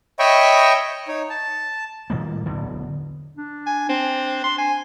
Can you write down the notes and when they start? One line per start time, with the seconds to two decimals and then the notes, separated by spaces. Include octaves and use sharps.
0.19 C#5 D#5 E5 G5 B5 C#6
1.08 D#4 C#5
1.30 A5
2.10 A2 D#3 G3 A#3
2.46 D1 B1 E2 D3
3.37 D4
3.66 G#5
3.89 C4 D4
4.44 C6
4.58 G#5